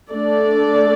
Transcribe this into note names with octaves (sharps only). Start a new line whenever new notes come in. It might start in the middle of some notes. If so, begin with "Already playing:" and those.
A3 D4 A4 D5